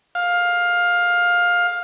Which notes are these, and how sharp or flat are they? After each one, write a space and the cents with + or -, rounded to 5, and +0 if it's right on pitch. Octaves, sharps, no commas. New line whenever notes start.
F5 +15